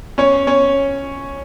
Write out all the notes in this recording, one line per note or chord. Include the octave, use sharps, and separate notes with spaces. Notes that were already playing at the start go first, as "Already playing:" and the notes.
C#4 C#5
C#4 C#5